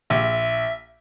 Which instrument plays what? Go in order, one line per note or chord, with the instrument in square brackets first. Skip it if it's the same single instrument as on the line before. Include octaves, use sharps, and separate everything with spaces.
[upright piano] A#1 [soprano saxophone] E5